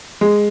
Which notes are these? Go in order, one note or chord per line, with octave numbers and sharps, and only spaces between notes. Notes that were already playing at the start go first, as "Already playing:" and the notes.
G#3